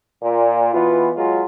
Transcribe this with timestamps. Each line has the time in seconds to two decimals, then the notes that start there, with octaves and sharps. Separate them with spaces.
0.22 A#2
0.74 B2 E3 B3 F4
1.16 F#3 G#3 F4